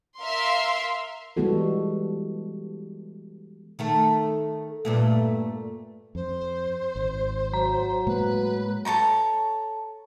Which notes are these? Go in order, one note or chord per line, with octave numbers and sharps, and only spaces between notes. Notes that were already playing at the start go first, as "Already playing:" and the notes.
A#4 E5 F5 C6
E3 G3 G#3 B3 F#4 A4
D#3 A3 A4
G2 A#2 A3
F2 C5
G#1
F#3 A#5
A2 G#3 A#3 B4
A4 A#4 C#5 A#5